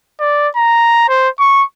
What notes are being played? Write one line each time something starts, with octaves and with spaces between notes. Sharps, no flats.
D5
A#5
C5
C#6